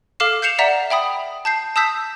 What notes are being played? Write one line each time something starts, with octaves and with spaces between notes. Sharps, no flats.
A4 F5 D6 F6 C7 E7
G6 C7 C#7 E7 F7
D5 E5 F#5 A#5 B6 E7
E5 G5 B5 D#6
A5 G6 C7
A5 D#6 E6 G6 B6